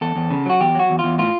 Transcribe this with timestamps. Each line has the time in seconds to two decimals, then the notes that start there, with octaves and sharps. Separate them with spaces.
0.01 E2 A4
0.16 E2
0.30 C#3
0.46 F#3 F#4
0.60 E2 G4
0.75 F#3 F#4
0.90 E2
0.99 F4
1.04 E2
1.18 A2 F4